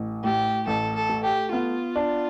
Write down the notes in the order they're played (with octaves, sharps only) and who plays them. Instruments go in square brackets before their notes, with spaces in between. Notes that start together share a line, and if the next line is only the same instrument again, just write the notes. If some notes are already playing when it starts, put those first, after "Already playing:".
Already playing: [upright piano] A1
[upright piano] A2 [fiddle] G4
[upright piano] A1 [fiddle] A4
[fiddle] A4
[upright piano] A3
[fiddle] G4
[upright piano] B3 [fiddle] F4
[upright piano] D4